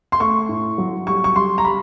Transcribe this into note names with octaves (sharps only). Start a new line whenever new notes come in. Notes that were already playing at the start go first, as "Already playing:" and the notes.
C6
A3 C#6
A2
F#3
G3 C#6
C#6
G3 C6
A#5
G3 B5